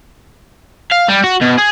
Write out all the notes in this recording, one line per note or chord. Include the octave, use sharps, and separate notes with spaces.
F5
G3
F#4
B2
G#4